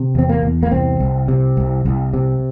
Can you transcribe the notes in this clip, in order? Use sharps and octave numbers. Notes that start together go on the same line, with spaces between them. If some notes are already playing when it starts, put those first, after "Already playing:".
Already playing: C3
E2 C4
A#3
E2
A#3
C2 C4
C2
C3
C2
C2
C3